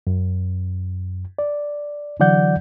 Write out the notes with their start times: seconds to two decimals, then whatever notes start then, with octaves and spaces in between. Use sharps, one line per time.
0.07 F#2
1.39 D5
2.20 D3 E3 F#3 D5 F#5 G6